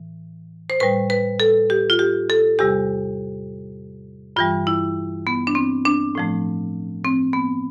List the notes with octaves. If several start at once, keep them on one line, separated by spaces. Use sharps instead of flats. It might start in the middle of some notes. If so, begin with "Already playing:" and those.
Already playing: A2 E3
C5
A2 G3 B4
B4
A4
G4
F4
G4
A4
E2 C3 G3 G4
G2 E3 G3 F4
E4
B3
D4
C4
D4
A2 F3 A3
C4
B3